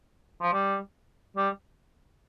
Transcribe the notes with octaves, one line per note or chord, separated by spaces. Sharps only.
F3
G3
G3